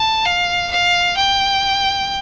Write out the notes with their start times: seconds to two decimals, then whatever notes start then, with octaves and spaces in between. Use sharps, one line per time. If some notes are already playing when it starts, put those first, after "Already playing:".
Already playing: A5
0.26 F5
0.71 F5
1.17 G5